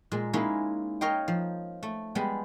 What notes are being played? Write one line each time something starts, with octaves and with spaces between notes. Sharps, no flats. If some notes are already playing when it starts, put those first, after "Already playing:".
A#2 G#3
G#3 A#3 C#4 D#4 E4
A#4 C#5 D#5 F5 G5
F3
A3
G3 G#3 B3